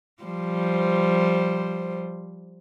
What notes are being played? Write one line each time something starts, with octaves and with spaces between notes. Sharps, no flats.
F3 G3 C5